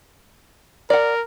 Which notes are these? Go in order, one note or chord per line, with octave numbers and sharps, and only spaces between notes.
A#4 D5 F#5